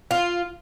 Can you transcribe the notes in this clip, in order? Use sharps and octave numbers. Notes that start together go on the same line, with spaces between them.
F4